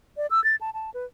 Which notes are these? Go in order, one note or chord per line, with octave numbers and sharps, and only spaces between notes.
D5
E6
A6
A5
A5
B4